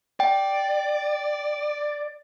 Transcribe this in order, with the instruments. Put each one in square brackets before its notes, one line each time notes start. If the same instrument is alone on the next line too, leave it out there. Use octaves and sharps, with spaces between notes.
[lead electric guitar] D5 [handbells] G5